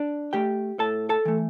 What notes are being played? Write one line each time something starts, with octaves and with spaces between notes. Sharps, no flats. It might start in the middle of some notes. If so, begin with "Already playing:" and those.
Already playing: D4 D5
A3 G4 G5
A2 A4 A5
A4 A5
E3 A3